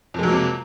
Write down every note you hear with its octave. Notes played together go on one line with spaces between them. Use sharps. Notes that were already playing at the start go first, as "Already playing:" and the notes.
F2 C3 F#3 G#3 A#3